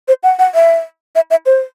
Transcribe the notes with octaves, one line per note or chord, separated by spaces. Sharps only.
C5
F#5
F#5
E5
E5
E5
C5